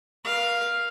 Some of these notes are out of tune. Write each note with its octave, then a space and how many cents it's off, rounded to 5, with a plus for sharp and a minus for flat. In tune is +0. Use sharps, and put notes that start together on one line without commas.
A#4 +45 F5 +0